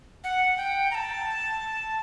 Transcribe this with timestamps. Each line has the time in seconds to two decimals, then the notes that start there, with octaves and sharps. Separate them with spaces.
0.24 F#5
0.57 G5
0.91 A#5
0.95 A5